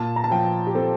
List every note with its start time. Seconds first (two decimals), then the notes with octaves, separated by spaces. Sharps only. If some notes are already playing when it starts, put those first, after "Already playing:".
Already playing: A#2 A5
0.16 A#5
0.24 A5
0.31 F3 G5
0.67 G4
0.75 C4 A4